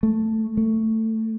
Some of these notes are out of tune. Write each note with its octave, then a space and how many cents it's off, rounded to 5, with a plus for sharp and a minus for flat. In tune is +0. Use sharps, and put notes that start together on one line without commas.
A3 +5
A3 +15